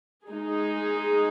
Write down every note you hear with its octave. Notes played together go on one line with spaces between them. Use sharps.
G#3 D#4 G#4